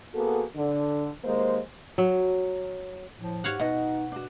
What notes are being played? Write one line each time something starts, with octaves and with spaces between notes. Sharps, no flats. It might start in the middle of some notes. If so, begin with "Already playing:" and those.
A#3 B3 F#4 G#4 A4
D3
D#2 G#3 A#3 C5
F#3
A2 F3
G#2 F#4 G4 C#5 F5 F#5
B2 D#4 D#5 F#5
D4 F#4